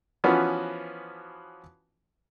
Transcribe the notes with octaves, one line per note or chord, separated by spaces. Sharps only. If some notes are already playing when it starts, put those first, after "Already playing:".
E3 F3 B3 C#4 F#4